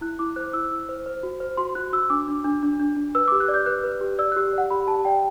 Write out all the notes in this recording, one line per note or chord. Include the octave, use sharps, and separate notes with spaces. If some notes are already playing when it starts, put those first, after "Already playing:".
E4 F#6
E4 D6
C5 F#6
E4 E6
E4
C5
C5
F#4
C5
F#4 C6
F#4 F#6
F#4 E6
D4 D6
D4
D4
D4
D4
D4
B4 E6
D6
G4
F#6
D5
G6
B4 F#6
B4
G4
D5 E6
F#6
G4
D5 F#5
G4 B5
G4 A5
D5 G5